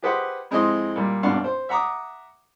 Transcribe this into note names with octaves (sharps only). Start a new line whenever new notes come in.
G4 G#4 B4 C5 D#5 F#5
F2 G#3 C4 E4 D#5 C6
A#2 G3
G#1 G2 B2 D4 F5 F#5
C5
E5 F#5 A#5 D6 D#6